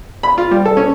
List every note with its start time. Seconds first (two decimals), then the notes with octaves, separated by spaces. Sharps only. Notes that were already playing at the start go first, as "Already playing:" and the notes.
0.23 B5
0.38 F4
0.51 G3
0.65 A4
0.77 C#4